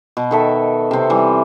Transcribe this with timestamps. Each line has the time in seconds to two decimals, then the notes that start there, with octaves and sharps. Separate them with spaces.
0.17 B2
0.31 D#3 A4 E5
0.91 C3 C4
1.10 E3 G3